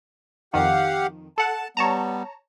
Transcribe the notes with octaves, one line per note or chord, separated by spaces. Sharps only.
F2 D#3 G4 F5 F#5
A4 F#5 A5
G3 B3 C#5 A5 A#5